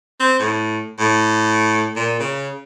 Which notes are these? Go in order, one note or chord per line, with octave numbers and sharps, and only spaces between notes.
C4
A2
A2
A#2
C#3